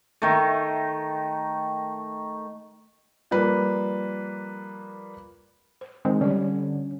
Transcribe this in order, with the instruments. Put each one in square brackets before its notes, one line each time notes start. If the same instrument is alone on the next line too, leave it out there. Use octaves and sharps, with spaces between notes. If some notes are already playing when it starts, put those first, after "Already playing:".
[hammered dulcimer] D#3 A3
[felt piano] F3 G3 A#3 B4
[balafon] C5
[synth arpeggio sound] D#3 G#3 C4
[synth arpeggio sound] D3 [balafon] G3 G4 [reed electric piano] C#4